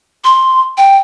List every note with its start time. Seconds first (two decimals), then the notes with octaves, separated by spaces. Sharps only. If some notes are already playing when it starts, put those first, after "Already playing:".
0.24 C6
0.77 G5